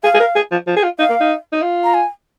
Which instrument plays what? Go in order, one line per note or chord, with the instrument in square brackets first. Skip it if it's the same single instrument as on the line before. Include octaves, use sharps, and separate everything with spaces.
[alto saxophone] G#4 [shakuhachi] F5
[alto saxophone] G#4
A#4
G#4
F3
F3
G#4
F4
[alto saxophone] D#4 [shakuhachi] F5
[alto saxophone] A#3
D#4
D#4
F4
[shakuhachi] A#5
G#5